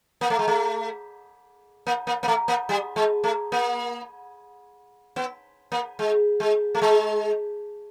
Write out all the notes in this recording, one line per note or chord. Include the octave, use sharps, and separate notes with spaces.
A#3
A3
G#3
A3
A#3
A#3
A#3
A3
A#3
G3
G#3
A3
A#3
B3
A#3
G#3
G#3
A3
G#3